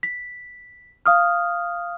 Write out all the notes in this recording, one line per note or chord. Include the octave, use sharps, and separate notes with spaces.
B6
F5 D#6 F6